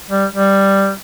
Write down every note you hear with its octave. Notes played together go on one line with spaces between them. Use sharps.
G3
G3